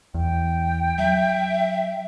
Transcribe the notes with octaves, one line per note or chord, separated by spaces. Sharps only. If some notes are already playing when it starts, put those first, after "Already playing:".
E2 G5
F#3 E5